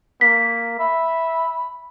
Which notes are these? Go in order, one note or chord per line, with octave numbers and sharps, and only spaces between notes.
A#3 B6
E5 B5